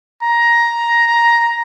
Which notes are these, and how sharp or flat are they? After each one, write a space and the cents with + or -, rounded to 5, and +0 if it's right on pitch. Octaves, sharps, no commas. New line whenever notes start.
A#5 +10